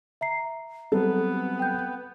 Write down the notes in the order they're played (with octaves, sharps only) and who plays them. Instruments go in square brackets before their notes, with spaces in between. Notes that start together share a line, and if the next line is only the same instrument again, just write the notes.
[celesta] E5 A#5 C7
[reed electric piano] F#3 G3 C4 [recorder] B3 [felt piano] A4
[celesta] G5 G6